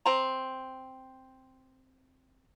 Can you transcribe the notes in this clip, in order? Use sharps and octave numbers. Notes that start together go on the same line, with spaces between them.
C4 A#5